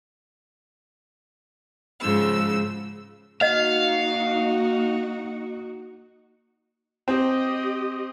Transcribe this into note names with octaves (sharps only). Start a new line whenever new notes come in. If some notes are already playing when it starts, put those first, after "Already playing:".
G#2 C#3 F3 E6
A#3 D#4 F#4 D#5 F5 F#5
C4 G4 D#5